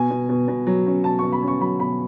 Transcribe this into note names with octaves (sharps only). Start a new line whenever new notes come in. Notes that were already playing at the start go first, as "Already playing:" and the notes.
Already playing: B2 G#5
B2
B2
B2
F#3
C#4
B2 A5
B2 C#6
B5
C#4 C#6
F#3 B5
B2 B5